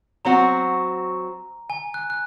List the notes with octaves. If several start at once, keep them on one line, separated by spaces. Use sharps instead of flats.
F#3 C4 F#4 A#5
G#5
F#6
F#6